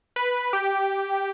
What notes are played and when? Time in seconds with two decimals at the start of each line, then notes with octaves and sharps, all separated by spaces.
0.16 B4
0.53 G4